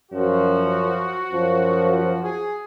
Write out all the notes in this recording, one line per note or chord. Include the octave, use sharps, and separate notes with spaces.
F#2 F3 F#4
F#2 F3
F#4
G#4